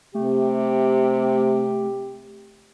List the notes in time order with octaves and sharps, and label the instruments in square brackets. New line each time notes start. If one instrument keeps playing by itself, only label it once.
[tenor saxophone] C3 [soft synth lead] A3 [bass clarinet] G4